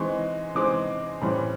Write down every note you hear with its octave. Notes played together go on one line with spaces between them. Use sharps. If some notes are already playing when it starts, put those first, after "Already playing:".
Already playing: E3 G#3 C4 D#4 C#6
E3 G#3 C4 D#4 D6
A2 E3 G3 C4